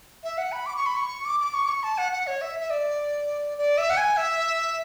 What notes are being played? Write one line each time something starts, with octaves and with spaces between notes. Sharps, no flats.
E5
F#5
B5
D6
C#6
B5
C#6
D6
D6
C#6
D6
C#6
A5
F#5
F#5
C#5
E5
E5
D5
D5
E5
F#5
G#5
E5